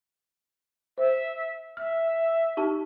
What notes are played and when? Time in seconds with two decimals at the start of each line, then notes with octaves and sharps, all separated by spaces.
0.98 C5 E5
1.77 E5 F6
2.57 D#4 G4 A5